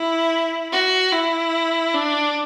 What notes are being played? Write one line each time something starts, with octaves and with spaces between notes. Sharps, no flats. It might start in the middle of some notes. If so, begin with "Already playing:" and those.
Already playing: E4
F#4
E4
D4